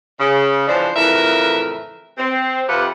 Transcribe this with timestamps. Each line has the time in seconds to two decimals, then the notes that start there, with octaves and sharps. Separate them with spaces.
0.19 C#3
0.67 E3 F3 D4 C5
0.96 F2 A2 C#3 E3 A#4 E5
2.18 C4
2.68 F2 C3 F3 G4 B4 F#5